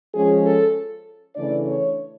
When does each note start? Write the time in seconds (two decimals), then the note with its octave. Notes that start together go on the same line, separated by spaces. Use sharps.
0.13 F3 G#3 C#4 G#4
0.44 A4
1.35 C#3 E3 A3 D4 D5
1.66 C#5